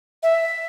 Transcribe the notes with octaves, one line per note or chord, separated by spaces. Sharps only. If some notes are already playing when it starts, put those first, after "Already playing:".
E5